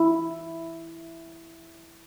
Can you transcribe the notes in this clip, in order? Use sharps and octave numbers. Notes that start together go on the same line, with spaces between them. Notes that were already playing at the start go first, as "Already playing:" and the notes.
Already playing: E4